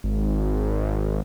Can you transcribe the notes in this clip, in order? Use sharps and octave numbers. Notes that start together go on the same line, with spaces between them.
G#1